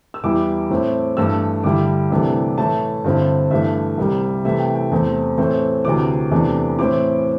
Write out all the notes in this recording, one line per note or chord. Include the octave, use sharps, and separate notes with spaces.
E6
E2 E3 G3 E4 D6
A2 A3 C4 E4
G2 E3 A3 E6
G2 D3 G3 E4 D6
C2 C3 E3 A3 D4
A2 E3 A3 E4 A5
G2 D3 C4 E4
G2 E3 A3 E5
C2 C3 G3
C3 E3 A3 E4 E5
G5
G5
E2 C3 A3 C4
A2 E3 A3 C4
D2 C3 E3 D6
E2 C3 E3 A3 D4
A2 E3 C4 E4 D6